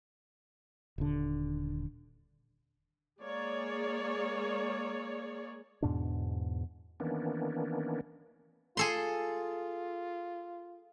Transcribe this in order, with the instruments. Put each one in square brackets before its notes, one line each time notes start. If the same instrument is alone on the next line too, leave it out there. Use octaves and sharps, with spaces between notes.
[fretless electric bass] D#1 D3
[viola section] G#3 A#3 G#4 C#5 D5
[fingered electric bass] E2 G#2 B2 D4
[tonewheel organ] D#3 E3 A#3 B3 C#4 D4
[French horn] F4 [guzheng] G#4 A4 C6